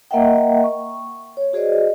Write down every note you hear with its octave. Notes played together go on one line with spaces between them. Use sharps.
A#3 A#4 D#5 E5 F#5 G5
C#6
C#5
F#4 G#4 C5 D5 D#5